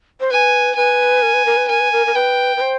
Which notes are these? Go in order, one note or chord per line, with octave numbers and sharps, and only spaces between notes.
C5
B4 G#5
B4 G#5
A#4
B4
A#4
B4
A#4 G#5
B4
A#4
A#4
B4 G5
B4
C5